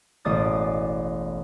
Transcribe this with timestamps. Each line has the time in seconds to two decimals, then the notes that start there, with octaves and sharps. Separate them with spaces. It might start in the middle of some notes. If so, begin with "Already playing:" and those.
0.25 E1 A1 D5 D#6 A6